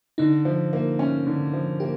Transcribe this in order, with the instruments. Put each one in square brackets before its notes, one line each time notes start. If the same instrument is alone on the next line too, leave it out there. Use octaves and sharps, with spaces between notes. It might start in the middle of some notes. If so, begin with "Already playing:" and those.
[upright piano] D3 [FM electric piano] D#4
[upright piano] F3
A#3
C#4
D3
F3
[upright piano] A#3 [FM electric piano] G4